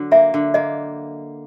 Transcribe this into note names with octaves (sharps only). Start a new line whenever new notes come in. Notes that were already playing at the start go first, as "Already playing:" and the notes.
Already playing: D3 F#3
A#3 E5
D3
A#3 D#5